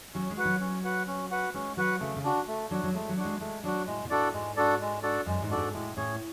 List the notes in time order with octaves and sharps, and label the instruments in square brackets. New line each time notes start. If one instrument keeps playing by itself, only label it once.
[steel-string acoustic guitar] F#3 [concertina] C#4
[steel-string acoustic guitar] G#3
[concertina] F#4 B4 F#5
[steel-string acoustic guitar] F#3
[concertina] C#4
F#4 B4 F#5
C#4
F#4 B4 F#5
[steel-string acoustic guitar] G#3 [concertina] C#4
[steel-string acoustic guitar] F#3 [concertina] F#4 B4 F#5
[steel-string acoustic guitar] C#3 [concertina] A3
[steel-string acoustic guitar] C#3
[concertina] D4 F#4
A3
[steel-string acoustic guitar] F#3 [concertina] D4 F#4
[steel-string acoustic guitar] F#3
[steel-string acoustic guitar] G#3 [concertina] A3
[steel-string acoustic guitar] F#3
[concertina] D4 F#4
[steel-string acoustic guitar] G#3
[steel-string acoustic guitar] G#3 [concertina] A3
[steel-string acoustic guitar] F#3 [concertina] D4 F#4
[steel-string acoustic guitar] A2 [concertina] G#3
[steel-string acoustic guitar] B2
[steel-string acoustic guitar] A2 [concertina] D4 F#4 A4 D5
[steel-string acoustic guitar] G#2 [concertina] G#3
[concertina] D4 F#4 A4 D5
G#3
D4 F#4 A4 D5
[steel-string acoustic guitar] F#2 [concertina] G#3
[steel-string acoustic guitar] G#2
[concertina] D4 F#4 A4 D5
[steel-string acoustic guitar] G#2
[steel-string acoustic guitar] A2 [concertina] G#3
[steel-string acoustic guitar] A2 [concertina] C#4 G#4 C#5